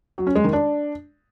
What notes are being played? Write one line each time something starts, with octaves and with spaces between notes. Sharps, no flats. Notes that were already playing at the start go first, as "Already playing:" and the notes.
F#3
C#4
G#3
D#3
D4